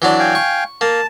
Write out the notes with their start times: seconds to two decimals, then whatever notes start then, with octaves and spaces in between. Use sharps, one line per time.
0.02 E3 F#3 D4
0.20 F5 G5 G#5
0.35 C#6
0.81 A#3 A5